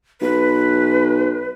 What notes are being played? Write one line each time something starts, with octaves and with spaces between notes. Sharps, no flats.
B1 B4